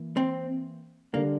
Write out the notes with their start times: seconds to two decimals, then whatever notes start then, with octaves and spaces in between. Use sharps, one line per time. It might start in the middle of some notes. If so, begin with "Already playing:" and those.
Already playing: E3 A#3
0.17 C4
1.13 D3 G3 A#3 D4